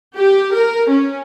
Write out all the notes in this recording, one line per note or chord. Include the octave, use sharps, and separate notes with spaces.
G4
A#4
C#4